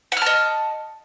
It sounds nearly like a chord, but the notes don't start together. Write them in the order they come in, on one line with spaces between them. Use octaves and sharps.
F#5 F6 A5 D#5